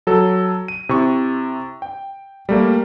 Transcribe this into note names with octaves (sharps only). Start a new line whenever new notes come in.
F#3 A4
D#7
C3 E4 C#6
G5
G3 A3 A#3